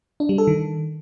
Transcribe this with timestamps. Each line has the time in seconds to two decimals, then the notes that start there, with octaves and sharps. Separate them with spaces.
0.20 D4
0.29 G3
0.38 A4
0.47 D#3